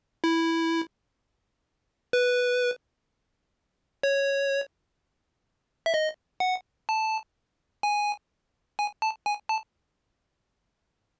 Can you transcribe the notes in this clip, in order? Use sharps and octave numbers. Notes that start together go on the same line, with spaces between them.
E4
B4
C#5
E5
D#5
F#5
A5
G#5
G#5
A5
G#5
A5